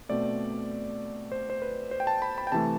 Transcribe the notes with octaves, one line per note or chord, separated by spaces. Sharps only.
B2 A3 C4 D5
C5
C5
B4
C5
G5
A5
B5
B5
G5
C3 E3 A3 A5